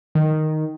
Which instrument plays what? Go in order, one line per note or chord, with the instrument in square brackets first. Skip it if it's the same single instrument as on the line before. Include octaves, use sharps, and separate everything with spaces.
[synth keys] D#3